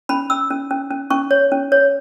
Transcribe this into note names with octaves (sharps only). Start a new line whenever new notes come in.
C#4 B5
C#4 E6
C#4
C#4
C#4
C#4 C#6
C#5
C#4
C#5